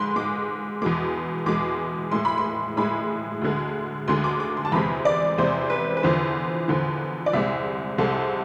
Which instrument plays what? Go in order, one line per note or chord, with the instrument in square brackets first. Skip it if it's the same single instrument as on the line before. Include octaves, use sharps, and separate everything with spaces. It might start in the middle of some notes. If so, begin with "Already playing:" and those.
Already playing: [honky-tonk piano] G#2 G#3 B5 C6
G#2 G#3 D6
E2 B2 G#3 D6
E2 B2 G#3 D6
A2 G#3 C6
B5
C6
A2 G#3 B5
D2 D3 G#3
D2 D3 G#3 C6
D6
D6
C6
A5
E2 C3 G#3 B5
D5
E2 C3 G#3 C5
B4
B4
E2 D3 F3 C5
E2 D3 F3
D5
C2 C3 G#3 E5
C2 C3 G#3 A4